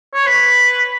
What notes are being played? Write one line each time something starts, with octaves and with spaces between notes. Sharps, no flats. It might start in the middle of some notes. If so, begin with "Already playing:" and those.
C#5
B4